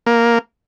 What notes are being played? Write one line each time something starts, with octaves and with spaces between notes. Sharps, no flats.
A#3